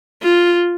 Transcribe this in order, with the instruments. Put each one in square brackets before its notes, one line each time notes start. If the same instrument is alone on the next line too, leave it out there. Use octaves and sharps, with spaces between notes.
[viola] F4